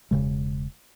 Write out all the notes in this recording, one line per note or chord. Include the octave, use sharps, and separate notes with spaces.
E1 C#3 G#3